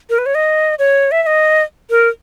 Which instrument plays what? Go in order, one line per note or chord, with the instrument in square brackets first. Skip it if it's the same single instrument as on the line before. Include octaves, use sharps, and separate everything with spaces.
[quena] A#4
B4
C#5
D#5
C#5
E5
E5
D#5
A#4